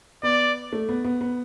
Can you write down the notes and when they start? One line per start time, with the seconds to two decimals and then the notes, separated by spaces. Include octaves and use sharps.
0.23 B3 D5
0.73 A3
0.89 B3
1.05 B3
1.21 B3